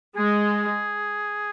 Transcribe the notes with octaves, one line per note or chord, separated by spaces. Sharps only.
G#3 G#4